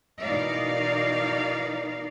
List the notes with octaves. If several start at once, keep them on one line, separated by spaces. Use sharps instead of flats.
B2 E3 D#4 A#4 D5 F5